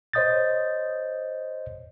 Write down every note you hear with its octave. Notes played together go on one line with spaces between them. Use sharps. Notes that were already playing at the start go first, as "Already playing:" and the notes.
C5 C#5 D#5 D#6 G6 A6